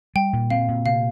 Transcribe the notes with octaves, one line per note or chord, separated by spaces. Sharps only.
G3 G5
A#2
C4 F5
A#2
C3 F5